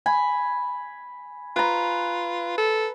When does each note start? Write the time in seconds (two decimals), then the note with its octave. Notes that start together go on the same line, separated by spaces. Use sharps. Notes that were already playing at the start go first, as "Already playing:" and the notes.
0.06 G#5 B5
1.56 F4 B4 A#5
2.58 A4